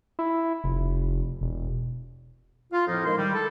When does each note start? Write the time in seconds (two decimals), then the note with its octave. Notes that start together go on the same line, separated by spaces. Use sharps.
0.19 E4
0.64 F1
1.41 E1
2.72 F4
2.87 F2 A2 F3 A#3 D#4
3.05 D#3 G#3 E4 F5 C6
3.17 D#3 G3
3.34 A4